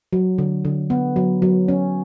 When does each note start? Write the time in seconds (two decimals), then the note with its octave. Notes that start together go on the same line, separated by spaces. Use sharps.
0.13 F#3
0.38 D3
0.65 D3
0.90 B3
1.16 F#3
1.42 F#3
1.68 C#4